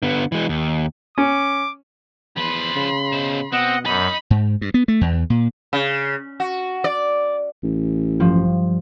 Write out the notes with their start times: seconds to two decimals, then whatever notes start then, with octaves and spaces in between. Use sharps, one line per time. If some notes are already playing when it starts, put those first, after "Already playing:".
0.03 D3 B3
0.32 E3 G#3
0.49 D#2
1.18 C#4 D6
2.37 E2 F3 B4 B5 C6
2.75 C#3
3.12 B2 C5
3.52 B2 C4 D#5 F#5
3.85 F#2 D#4 B5
4.30 G#2
4.61 G2
4.74 B3
4.88 A3
5.01 E2
5.30 A#2
5.73 C#3
6.40 F#4
6.84 D5
7.63 A1
8.20 G2 F3